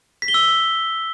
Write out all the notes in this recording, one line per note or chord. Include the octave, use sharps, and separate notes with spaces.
B6
G7
E6